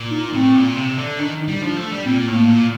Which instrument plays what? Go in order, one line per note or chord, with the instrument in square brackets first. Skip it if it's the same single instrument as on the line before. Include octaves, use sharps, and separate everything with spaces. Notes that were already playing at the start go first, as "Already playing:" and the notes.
Already playing: [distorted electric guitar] A#2
[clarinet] D#4
[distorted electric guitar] A2 [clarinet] C4
[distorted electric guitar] A#2
C3
D3
[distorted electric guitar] D#3 [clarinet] D4
[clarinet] D#4
[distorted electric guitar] G3
[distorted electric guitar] F3 [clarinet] D4
[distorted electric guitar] A3
G3
[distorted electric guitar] A#2 [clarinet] C4
[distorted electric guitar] A2 [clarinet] A#3
[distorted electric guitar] A#2